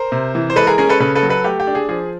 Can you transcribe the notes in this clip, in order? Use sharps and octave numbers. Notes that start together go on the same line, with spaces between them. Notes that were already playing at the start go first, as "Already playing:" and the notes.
Already playing: A#4 C5
C3
E3
C5
G#3 A4 B4
G#4 A#4
C#4 G#4 A#4
A4 B4
C#3 A4 B4
A4 B4
F#3
A4 B4
A3 G4
G4
D4
G#4
F3 G#4